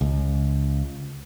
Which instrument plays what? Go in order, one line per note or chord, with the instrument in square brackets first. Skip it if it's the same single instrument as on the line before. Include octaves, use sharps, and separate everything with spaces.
[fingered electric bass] C#2